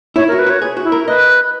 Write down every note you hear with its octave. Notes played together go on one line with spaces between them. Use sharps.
E4 C#5
A#4
F#4
B4
F#4 C#5
G#4
F#4
E4
A#4
B4 D#5